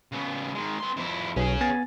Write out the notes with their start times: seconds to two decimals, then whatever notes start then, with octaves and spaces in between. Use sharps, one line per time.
0.12 C#3 B3
0.55 D#3 G#3
0.79 B3 C6
0.97 F2 E4
1.36 B1 C#4 G#4
1.61 B3 G#5 A6